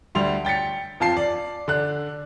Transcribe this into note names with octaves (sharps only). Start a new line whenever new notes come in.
D2 G3 C6 F7
G5 A6 B6 C#7
F2 F4 A5 C7
D5
D3 D4 F#6